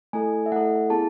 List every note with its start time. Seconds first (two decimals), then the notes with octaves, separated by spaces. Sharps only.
0.13 A3 E4 A4 G#5
0.46 E5
0.52 A3 E4 A4 F#5
0.90 B3 E4 G#4 A5